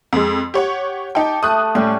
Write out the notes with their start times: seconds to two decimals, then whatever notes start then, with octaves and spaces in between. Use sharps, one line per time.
0.13 F2 G#3
0.54 G4 C#5 F#5
1.15 D#4 G4 G5 A5
1.43 A3 D#6 F#6
1.75 A2 G3 C#4